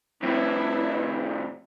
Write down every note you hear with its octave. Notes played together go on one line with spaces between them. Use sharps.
F2 A2 E4 B4